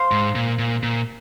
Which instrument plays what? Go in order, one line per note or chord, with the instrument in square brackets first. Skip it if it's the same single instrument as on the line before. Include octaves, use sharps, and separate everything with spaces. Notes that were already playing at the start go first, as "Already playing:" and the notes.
Already playing: [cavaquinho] C5 F5 C6
[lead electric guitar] G#2
A#2
A#2
A#2